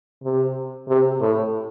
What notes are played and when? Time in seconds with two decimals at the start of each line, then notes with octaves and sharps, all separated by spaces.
0.23 C3
0.88 C3
1.20 A2